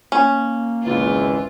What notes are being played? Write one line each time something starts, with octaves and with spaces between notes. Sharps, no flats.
A#3 C#4
G#1 C#2 E3 F4